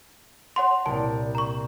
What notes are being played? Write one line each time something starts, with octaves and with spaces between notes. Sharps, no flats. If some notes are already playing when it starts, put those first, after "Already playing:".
C#5 F#5 C6
C2 A#2 A5
A#5 C#6